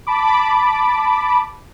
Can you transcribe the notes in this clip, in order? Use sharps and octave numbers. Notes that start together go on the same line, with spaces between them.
A5 B5 D6